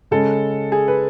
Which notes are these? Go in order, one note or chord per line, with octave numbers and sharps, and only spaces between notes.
C#3 G#3 C#4 A4
G#4
B4